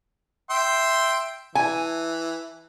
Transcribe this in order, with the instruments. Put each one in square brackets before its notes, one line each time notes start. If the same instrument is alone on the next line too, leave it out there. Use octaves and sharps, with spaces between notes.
[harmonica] E5 G5 C6
[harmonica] E3 [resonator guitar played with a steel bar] G#5